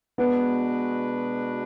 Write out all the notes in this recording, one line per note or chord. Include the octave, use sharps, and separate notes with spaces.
B2 G#3 B3 D4 F#4 B4